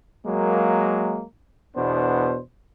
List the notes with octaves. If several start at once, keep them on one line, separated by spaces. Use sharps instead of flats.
F#3 G#3 A#3
E2 B2 B3 D4 C5